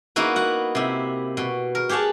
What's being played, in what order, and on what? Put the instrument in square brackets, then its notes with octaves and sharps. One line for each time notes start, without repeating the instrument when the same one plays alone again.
[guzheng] A#3 B3 D#4 E4 F#4
F#4 F#5
C3 E4
B2
A#4
G4 G#4 C#5 F#5 A5